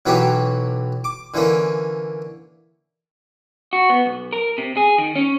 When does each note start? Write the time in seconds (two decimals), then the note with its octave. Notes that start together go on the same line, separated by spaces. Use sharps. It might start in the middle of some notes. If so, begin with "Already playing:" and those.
0.06 B1 E3 F#3 B3 C#4 G4
1.04 D6
1.34 D3 E3 A#3 C#4
3.73 F#4
3.89 B3
4.06 B1
4.33 A#4
4.58 C3
4.77 G#4
4.98 D#3
5.15 C#4